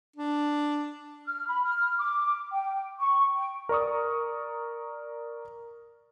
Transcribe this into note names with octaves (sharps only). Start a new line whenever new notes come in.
D4
F6
B5
F6
D6
G5
C#6
G5
A#4 D5 C#6 D#6